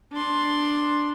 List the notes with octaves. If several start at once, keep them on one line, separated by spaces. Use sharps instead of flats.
D4 C6